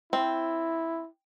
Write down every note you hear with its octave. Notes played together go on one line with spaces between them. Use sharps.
C4 E4